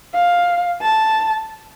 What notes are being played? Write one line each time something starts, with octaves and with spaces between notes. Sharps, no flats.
F5
A5